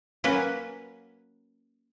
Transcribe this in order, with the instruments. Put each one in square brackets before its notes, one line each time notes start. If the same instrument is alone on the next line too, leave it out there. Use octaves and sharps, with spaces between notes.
[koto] F#3 A#3 C#4 B4